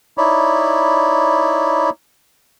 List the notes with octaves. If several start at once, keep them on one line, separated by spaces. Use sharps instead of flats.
D#4 E4 C#5 D5 B5